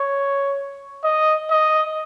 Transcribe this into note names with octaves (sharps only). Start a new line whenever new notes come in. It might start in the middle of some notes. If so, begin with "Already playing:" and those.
Already playing: C#5
D#5
D#5